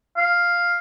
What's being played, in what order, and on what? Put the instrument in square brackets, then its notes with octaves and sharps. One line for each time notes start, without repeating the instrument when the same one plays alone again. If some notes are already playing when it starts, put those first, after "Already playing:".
[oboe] F5